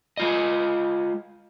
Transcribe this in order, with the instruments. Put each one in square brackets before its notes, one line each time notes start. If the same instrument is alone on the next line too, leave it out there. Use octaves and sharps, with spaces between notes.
[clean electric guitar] G#3 F4 D#5